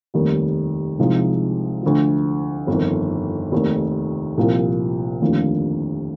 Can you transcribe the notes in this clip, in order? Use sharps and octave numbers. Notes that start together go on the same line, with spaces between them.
F1 D#2 D#3 G3
C2 C3 F3 G#3 D#4
D2 D3 F3
G1 F2 D#3
F1 D#2 D#3
C2 A#2 F3 A#3
F1 D#2 D3 F3 A#3